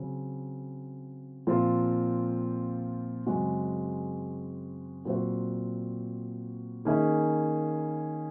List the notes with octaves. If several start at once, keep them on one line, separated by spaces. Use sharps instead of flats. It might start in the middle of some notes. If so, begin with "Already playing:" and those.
Already playing: C#3 F#3 C4
A#2 F3 C4 F4
F#2 C#3 G#3 C4 F#4
A#2 F#3 C4 F#4 C5
D#3 A#3 C#4 G#4 D#5